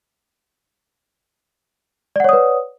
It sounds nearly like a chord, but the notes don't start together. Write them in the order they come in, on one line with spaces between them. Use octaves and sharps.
D5 F#5 C#5 D#6 B4